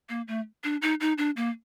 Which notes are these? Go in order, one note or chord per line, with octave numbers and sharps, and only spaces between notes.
A#3
A3
D4
D#4
D#4
D4
A#3